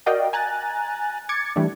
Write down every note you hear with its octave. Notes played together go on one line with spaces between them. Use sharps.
F#4 A#4 D5 D#5 F5 G5
G#5 A#5 F#6 A6
D6 G#6 A6 C#7
E3 G3 A3 D4